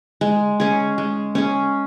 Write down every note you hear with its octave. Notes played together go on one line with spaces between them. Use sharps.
G#3
C#4 G#4
G#3
C#4 G#4